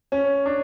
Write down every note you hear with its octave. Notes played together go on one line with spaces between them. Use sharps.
C#4
D4